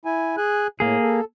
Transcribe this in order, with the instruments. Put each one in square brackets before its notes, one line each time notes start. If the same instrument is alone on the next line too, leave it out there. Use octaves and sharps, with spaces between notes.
[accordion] E4 G#5
G#4 G#5 F#6
[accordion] A2 [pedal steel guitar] A#3 G#4
[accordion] A4